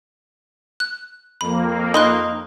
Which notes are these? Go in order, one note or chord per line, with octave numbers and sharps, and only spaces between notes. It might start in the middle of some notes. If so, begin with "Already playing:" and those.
F#6
F2 A#3 B5
D#4 B5 C6 F#6